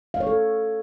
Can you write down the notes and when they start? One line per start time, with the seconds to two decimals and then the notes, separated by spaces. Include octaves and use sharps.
0.14 F5
0.20 C#5
0.27 A4